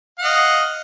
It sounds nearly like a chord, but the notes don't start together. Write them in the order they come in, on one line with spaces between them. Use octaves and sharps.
F#5 F5 D#5